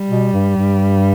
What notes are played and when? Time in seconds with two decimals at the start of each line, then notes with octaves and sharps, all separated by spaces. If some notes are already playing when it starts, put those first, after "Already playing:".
Already playing: G3
0.09 B2
0.33 G2
0.56 G2